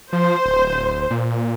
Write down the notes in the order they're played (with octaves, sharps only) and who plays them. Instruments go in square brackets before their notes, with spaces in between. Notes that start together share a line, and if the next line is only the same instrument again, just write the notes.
[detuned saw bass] F3 [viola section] C5
[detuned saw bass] D1
A#2